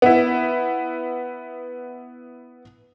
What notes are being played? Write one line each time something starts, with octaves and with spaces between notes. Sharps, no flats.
B3 E4